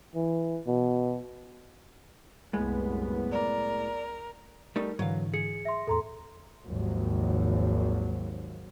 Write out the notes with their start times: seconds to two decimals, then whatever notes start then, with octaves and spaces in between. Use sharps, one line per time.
0.15 E3
0.67 B2
2.53 C2 F#2 A2 G#3 B3
3.32 A#4 D5
4.76 G3 A3 D#4 A#4
4.99 G#2 D3 E3 F#3 F5
5.34 G#4 C#7
5.65 E5 C6 A#6
5.87 E2 A2 A4 A#5 C6
6.65 G#1 D#2 F3 F#3